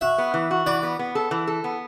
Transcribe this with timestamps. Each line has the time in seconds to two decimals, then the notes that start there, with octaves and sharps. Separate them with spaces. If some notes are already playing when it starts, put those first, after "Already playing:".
0.01 F#4 E5
0.18 B3
0.34 E3
0.51 F#4
0.66 E3 D5
0.83 B3
0.99 B3
1.15 A4
1.31 E3
1.47 A4
1.64 B3